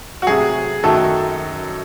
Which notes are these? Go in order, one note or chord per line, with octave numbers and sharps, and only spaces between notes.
F#4
C3 F#3 A3 G#4
F#2 D#3 F#3 A3 A4